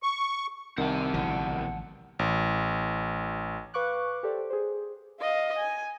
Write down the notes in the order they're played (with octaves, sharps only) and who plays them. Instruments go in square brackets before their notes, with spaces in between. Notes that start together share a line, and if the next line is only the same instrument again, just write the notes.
[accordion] C#6
[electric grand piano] C2 D#3 [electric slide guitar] C4 E5 [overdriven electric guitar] F#5 A5
[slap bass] A1 D3 F3 [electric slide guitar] B2 E4
[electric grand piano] A1
[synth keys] B4 F5 C#6 D6 F#6
G4 A4 C5 D5
G#4 C5
[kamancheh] D#5 F5
G#5